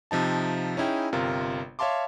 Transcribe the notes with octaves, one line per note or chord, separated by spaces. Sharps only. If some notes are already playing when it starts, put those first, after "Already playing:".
C3 F3 D#4 A5
C#4 D#4 E4 G#4 G5
G1 C3 F4 A#4
C#5 E5 F5 A5 C6 D6